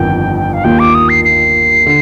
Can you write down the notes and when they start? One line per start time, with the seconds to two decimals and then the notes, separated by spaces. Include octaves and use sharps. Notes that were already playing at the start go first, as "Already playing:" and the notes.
Already playing: G1 F2 D#3 G5
0.53 F5
0.64 D#2 D#3 A#3 F4 G5
0.79 D6
0.95 D#6
1.09 C7
1.24 C7
1.86 D3